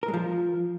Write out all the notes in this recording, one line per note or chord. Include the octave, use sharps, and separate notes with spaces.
A#4
G#3
F3